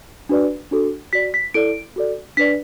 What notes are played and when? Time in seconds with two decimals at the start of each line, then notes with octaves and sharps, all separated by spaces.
0.29 D4 F#4 B4 D5
0.71 D4 F#4 A4
1.13 F#4 D5 B6
1.34 B6
1.54 E4 A4 D5 D7
1.96 F#4 A4 D5
2.37 D4 B4 D5 B6